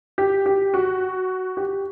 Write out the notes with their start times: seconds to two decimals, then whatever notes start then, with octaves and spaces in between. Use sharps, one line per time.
0.18 G4
0.46 G4
0.74 F#4
1.57 G4